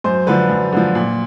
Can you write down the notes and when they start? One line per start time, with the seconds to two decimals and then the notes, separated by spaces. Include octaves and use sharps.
0.04 F#2 C5
0.27 D3 F3 B4
0.49 F#2
0.73 D3 F3
0.95 A#2